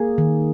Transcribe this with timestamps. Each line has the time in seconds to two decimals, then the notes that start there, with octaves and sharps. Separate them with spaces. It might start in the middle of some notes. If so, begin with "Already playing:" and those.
Already playing: A#3 G#4
0.18 D#3